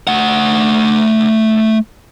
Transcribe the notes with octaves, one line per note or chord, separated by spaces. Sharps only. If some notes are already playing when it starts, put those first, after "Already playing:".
A3 F#5